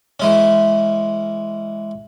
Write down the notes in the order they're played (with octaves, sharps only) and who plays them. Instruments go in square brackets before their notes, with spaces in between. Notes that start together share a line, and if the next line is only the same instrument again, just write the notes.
[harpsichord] E3 G#3 C#4